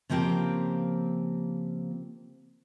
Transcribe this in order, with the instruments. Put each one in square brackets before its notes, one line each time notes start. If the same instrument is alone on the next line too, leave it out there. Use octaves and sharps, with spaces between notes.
[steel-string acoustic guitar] C#3 F3 A#3 C4 G4 A#5